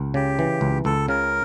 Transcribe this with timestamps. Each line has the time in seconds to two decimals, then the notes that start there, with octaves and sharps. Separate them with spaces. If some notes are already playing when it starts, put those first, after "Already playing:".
Already playing: C#2
0.14 C#3 G4
0.39 E3
0.61 C#2
0.85 C#2 A4
1.09 C#3 A#4